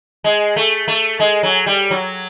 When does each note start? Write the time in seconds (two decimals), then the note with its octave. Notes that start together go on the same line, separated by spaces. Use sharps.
0.24 G#3
0.56 A3
0.88 A3
1.20 G#3
1.43 F#3
1.66 G3
1.91 F#3